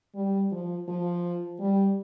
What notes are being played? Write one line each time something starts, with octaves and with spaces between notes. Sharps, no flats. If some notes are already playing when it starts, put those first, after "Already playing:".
G3
F3
F3
G3